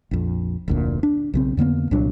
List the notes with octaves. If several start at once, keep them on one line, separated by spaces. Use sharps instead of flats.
A#1 F2
F1 D2 A#2
D4
B1 C#3 C4
F2 D3 A#3 B3
C2 A#2 F#3 D4